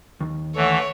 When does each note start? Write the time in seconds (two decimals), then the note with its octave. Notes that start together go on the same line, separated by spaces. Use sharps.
0.21 D#2
0.56 D3 E3 A3 A4 C#5